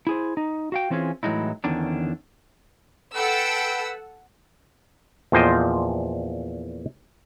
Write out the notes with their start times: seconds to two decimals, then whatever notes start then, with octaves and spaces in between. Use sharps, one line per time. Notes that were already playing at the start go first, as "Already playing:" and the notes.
0.07 E4 G#4 C5
0.37 D#4
0.72 F#4 F5 G5
0.90 E3 C4 C#4 F4 G#4
1.23 A2 E3 F#3 G#3 D#4 E4
1.64 E2 D3 D#3 C#4 D4
3.16 A4 B4 F#5 G5 E6
5.32 E2 A#2 F3 C5 D#5 G5